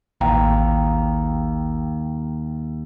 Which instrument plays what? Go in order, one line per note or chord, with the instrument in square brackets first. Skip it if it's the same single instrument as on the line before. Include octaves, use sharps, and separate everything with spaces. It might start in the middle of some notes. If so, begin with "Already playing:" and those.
[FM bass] A1 [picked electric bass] D#2 [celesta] F5 G5 A#5